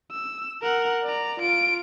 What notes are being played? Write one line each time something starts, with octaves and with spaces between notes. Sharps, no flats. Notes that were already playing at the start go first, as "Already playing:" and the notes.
E6
A#4 F#5
D5 A#5
F4 D7